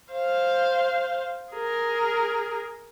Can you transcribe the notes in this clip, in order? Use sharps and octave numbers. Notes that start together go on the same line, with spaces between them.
C5 F5
G#4 A#4